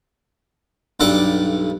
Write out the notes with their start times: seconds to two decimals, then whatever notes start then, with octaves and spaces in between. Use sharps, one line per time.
1.00 B1 G2 A4 F#5 D6